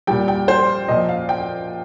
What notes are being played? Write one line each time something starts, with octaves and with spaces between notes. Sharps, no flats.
A#2 G3 G5
G5
C5
A#2 F3 D#5
F5
G5